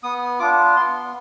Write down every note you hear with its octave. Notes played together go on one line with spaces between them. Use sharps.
B3 D#6
D4 F4 D6
B3 C6